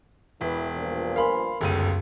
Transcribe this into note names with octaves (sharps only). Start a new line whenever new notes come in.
E1 E3
G2 A#2 F3
A#4 F5 G#5 B5 C6
G1 C#2 F#2 D#7